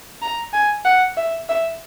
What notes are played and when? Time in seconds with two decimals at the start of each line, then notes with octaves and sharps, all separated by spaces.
0.22 A#5
0.53 G#5
0.85 F#5
1.17 E5
1.49 E5